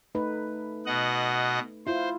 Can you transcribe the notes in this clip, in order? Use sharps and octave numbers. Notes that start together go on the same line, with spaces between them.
A3 D#4 B4
B2 D#5 F#5
E4 F4 C5